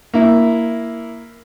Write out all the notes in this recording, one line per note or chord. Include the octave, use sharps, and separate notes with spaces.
A#3 E4